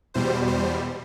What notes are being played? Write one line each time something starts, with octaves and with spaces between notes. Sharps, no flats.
E2 B2 G3 C5
C5